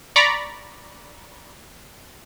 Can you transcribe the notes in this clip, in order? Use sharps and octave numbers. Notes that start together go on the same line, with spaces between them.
D5 A#5 B5 C#6 D6